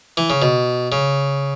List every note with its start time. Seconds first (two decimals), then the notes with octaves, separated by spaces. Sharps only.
0.17 E3
0.30 C#3
0.42 B2
0.92 C#3